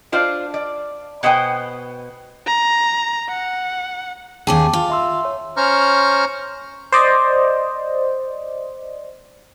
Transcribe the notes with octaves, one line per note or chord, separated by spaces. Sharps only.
D4 F4 C5 D5
D5
B2 B3 C5 G5 G#5
A#5
F#5
D#2 C#4 G#4 G5 A5 D6
F4
E5 C6 E6
C#5
C#4 C5 C#5 A#5 C#6 F6
C5 D5 D#5